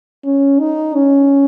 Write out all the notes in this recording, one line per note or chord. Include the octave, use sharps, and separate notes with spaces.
C#4
D#4
C#4